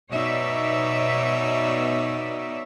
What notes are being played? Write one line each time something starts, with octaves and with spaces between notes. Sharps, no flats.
B2 D#4 C#5 D5 E5